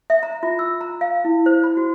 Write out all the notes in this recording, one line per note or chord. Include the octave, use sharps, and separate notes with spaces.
E5
A#5
F4
E6
A#5
F5
E4
C5
B5
F#4